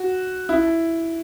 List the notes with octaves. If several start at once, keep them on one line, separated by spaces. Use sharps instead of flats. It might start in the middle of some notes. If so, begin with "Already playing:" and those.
Already playing: F#4
E4